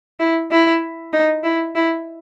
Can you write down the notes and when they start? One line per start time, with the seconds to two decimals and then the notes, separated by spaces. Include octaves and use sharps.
0.20 E4
0.51 E4
1.13 D#4
1.44 E4
1.75 E4